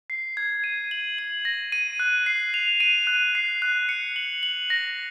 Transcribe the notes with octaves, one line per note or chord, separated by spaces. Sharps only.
C7
G#6
D#7
F#7
F#7
A#6
D#7
F#6
C7
F7
D#7
F#6
C7
F#6
C#7
F#7
F#7
A#6